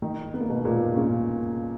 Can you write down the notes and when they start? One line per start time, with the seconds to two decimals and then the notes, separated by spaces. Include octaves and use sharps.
0.02 D#3 D#4
0.34 B3
0.41 A#3
0.49 B2 B3
0.65 A#2 A#3
0.96 C#3 C#4